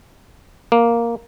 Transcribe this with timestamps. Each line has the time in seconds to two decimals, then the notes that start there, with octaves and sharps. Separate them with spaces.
0.72 A#3